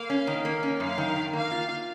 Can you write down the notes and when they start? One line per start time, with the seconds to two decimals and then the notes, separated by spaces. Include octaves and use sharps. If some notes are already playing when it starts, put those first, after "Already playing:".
Already playing: A#3 F5
0.10 C#4
0.27 D#3
0.45 A#3
0.63 C#4
0.80 F#2 F5
0.98 D#3
1.16 D#3
1.33 A#3 F5
1.51 F4
1.69 F4